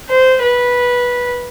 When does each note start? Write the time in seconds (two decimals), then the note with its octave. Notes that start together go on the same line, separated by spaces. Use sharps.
0.09 C5
0.42 B4